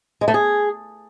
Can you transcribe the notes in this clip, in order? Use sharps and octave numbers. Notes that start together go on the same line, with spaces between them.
G#3
A3
G#4